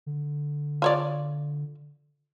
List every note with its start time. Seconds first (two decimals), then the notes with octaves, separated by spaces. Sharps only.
0.06 D3
0.82 F4 C#5 D5